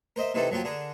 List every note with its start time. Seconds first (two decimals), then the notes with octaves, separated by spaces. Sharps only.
0.16 A#4 C5 D#5 E5
0.34 C3 D#3 E3 C4 D#4 A4
0.51 F3 F#3 A#3 F4 G4
0.64 D3 G#4 A#4